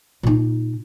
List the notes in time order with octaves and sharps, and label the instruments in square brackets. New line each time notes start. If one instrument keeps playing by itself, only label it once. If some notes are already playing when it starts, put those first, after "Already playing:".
[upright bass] A#2 D#4